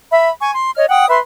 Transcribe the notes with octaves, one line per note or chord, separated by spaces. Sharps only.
E5 B5
G#5 C#6
C6
C#5 D#5 F6
F#5 G5 D#6
B4 E5 C6